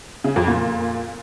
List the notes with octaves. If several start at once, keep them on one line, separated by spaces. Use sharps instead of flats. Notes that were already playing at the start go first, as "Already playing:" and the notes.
C#3
F2
A#2